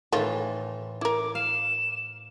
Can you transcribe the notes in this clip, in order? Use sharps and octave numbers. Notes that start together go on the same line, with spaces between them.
A2 D#3 E3 A3 F4
E4 A#4 D6
F5 E7